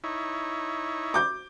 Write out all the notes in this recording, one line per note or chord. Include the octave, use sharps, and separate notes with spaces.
D#4 E4 C#5
D6 G6